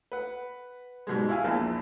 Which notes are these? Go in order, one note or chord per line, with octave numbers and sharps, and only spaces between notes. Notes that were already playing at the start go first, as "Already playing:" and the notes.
B4 F#5
G#2 B2 G3 G#3
E4 G#4 F5 G#5
A#1 E2 A#2 A5